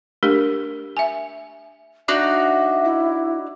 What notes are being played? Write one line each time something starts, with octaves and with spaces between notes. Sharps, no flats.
A3 D4 G4 A#4
E5 G#5
D4 D#4 F#4 E5
E4